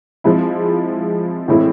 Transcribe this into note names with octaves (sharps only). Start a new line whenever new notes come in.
F3 G#3 C4 E4
A2 E3 G#3 C4 E4